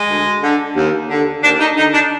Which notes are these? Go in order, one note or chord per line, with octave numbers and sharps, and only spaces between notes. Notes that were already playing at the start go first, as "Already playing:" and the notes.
Already playing: G#3
D2
D3
D#2
D3
D#2 D4
D#4
D3 D#4
D4